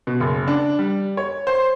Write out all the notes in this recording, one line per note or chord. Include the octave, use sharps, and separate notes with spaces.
B2
F#1
D4
G3
C#5
C5